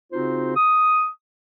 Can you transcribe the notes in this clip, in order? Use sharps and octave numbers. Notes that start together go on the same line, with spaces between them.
C#3 C4 D#4 F4 F#4 C5
D#6